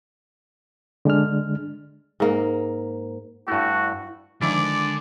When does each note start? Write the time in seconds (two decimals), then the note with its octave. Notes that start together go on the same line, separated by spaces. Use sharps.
1.05 D3 G#3 D4 F6
2.20 G#2 A#3
3.48 G2 A3 E4 F#4
4.42 D3 D#3 F3 G#3 E4 D5 D6